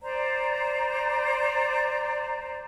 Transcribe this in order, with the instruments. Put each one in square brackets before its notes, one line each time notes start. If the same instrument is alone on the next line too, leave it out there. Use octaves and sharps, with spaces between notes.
[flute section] C5 D5 A#5